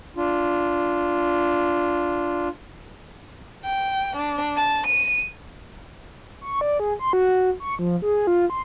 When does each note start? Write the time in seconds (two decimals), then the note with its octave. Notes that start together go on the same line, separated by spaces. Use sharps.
0.17 D4 F4
3.65 G5
4.16 D4
4.56 A5
4.86 D#7
6.41 C#6
6.61 D5
6.80 G#4
6.99 C6
7.13 F#4
7.60 C#6
7.79 F3
8.02 G#4
8.27 F4
8.50 C6